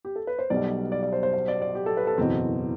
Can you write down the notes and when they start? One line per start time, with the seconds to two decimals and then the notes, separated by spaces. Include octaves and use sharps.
0.05 G4
0.16 A4
0.27 B4
0.39 C5
0.50 B1 B2 G3 D5
0.92 D5
1.03 D5
1.13 C5
1.23 C5
1.34 C5
1.48 D5
1.62 D5
1.75 G4
1.86 A4
1.97 B4
2.07 A4
2.18 F#1 E2 B2 C4